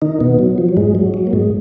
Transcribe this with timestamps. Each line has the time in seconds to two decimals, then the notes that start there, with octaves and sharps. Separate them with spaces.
0.02 D#3 D#4
0.21 B2 B3
0.39 F#3
0.58 F3
0.69 F#3
0.77 G#2 G#3
0.95 F#3
1.14 F#3
1.27 A#3
1.33 G#2 G#3